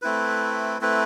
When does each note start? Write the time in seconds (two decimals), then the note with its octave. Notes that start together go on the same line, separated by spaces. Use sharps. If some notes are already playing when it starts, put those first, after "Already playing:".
0.02 A3 C4 E4 B4
0.81 A3 C4 E4 B4